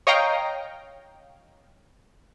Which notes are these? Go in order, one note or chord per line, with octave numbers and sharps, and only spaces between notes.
C#5 D#5 F5 G5 A#5